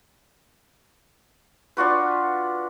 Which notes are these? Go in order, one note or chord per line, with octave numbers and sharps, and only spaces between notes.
D4 F4 F#4 B4